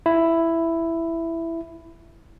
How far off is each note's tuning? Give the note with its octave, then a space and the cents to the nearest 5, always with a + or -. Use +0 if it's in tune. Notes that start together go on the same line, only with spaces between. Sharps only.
E4 +5